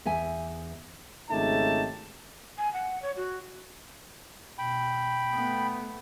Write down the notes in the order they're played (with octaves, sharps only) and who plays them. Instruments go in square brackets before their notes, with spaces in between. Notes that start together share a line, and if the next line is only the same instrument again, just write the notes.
[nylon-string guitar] E2 E5 G#5
[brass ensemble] G#1 C#3 A3 D#4 G4 A5
[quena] G#5
F#5
C#5
F#4
[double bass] B2 [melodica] G5 B5
[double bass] A3 B3